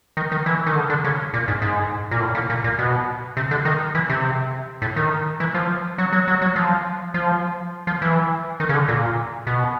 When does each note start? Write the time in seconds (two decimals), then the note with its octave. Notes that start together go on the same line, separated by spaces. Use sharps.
0.17 D#3
0.32 D#3
0.46 E3
0.67 D#3
0.75 D3
0.90 D3
1.04 C#3
1.34 A#2
1.48 G#2
1.62 G#2
2.11 A#2
2.20 A2
2.35 A#2
2.50 A#2
2.64 A#2
2.79 B2
3.37 C3
3.51 D3
3.65 D#3
3.95 E3
4.09 C3
4.82 A2
4.96 D#3
5.40 E3
5.54 F3
5.98 F#3
6.13 F#3
6.28 F#3
6.42 F#3
6.56 F3
7.14 F3
7.87 F3
8.02 E3
8.60 D#3
8.69 C#3
8.74 D3
8.88 A#2
9.47 B2